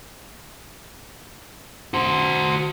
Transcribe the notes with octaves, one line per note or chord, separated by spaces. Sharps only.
F#4 C5